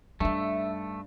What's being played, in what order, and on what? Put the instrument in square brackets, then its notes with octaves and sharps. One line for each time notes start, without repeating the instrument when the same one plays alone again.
[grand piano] G2 [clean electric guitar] A3 [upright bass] D4 D#4 [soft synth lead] E5